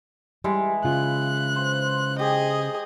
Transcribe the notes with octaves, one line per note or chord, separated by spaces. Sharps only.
E3 G3 G#3
C#3 F4 F#6
C5
G4 G#4 D#5